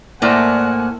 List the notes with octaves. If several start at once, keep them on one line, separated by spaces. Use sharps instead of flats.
A2 A#3 A#4 C5 D5 F#5 G#5